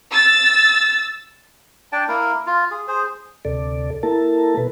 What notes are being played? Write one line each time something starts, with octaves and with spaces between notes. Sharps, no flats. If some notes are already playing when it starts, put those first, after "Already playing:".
E6 A6
D4 D5 G5 A5
A#3 E4 A#4
F4
G#4
G#4 C5
D2 C3 A4 D5
A#3 E4 A4 A#4 A5
B2 B4